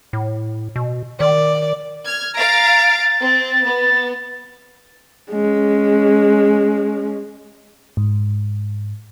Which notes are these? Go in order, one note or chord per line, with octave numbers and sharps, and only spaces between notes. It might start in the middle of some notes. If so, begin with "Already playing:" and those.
A2
B2
D#3 D5
F6 G#6
F5 A#5 A6 D7
C4
B3
G#3 C#4
G#2